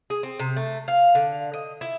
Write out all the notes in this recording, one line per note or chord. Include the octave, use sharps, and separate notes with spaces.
G#4
C4
C3
A3
F5
D3
D#5
E4